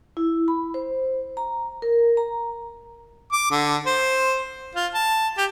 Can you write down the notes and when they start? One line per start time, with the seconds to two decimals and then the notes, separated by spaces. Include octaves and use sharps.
0.17 E4
0.48 B5
0.74 C5
1.37 A#5
1.82 A#4
2.17 A#5
3.32 D6
3.51 D3
3.86 C5
4.75 F4
4.94 A5
5.38 G4